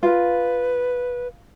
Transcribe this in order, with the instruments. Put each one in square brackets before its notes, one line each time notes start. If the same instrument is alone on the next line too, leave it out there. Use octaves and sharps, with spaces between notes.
[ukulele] F4 [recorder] B4